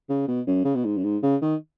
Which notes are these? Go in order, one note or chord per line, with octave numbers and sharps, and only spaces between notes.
C#3
B2
F#2
C#3
B2
G#2
F#2
G#2
C#3
D#3